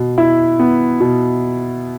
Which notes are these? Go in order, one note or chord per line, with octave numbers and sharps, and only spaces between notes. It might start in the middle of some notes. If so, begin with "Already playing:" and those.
Already playing: B2
E4
B3
B2